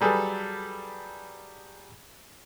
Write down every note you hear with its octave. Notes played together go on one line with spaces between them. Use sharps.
F#3 G3 G#4 A4 B4